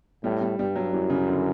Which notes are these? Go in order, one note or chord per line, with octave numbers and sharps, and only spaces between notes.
A2 G3
G3
G2 G3
F#3
F#2 E3
C#3
D3